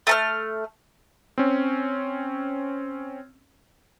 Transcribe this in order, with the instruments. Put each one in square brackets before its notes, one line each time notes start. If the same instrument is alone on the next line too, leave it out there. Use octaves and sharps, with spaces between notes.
[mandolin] A3 A5 F6
[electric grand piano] C4 C#4